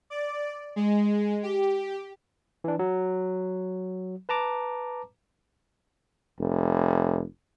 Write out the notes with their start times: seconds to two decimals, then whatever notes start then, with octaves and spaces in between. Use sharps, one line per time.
0.10 D5
0.76 G#3
1.43 G4
2.64 E3 D4
2.79 F#3
4.29 B4 A5 A#5 D6
6.39 F1